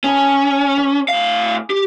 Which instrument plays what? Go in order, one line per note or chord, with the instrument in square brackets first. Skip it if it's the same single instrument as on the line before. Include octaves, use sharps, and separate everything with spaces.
[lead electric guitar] C#4 [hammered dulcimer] G#4 A5 B5
[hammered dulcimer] D6
[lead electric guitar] A2 F5
G4